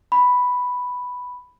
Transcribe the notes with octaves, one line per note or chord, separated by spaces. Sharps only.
B5